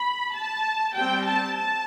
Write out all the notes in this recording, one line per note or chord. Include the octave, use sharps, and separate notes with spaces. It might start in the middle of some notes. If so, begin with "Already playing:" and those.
Already playing: B5
A5
G3 C4 G5
A5
A5